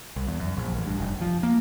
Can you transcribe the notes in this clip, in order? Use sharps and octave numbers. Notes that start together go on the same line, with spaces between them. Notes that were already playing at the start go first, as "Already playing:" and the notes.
C2
E2
F#2
A#1
A1
G2
F1
F3
A#3